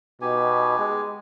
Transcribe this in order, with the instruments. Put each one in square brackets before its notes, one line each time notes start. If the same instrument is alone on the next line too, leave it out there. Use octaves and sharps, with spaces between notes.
[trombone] B2 [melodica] D#4 G4 G#5
[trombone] G#3